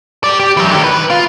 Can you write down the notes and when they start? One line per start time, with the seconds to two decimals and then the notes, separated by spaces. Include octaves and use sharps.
0.24 G4 D5
0.40 G4
0.57 E3 F#3
0.71 D3 D#3
0.84 B4
1.10 F4